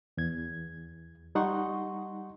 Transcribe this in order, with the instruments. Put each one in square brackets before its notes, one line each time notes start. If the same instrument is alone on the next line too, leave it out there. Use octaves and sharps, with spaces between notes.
[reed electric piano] E2 G#6
G3 D#4 F#5 C6 C#6